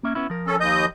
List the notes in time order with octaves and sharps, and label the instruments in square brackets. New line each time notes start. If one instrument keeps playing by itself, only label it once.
[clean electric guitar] A#3 C#4 E5
B3 C#4 E4
F3 A#4
[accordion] C#4 A4
D#2 D#5 G6